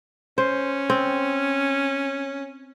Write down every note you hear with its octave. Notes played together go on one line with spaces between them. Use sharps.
C#4 C5
C4